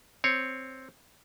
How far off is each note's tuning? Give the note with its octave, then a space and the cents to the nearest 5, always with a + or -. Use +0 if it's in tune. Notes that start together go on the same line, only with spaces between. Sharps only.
C4 +0 C#5 +0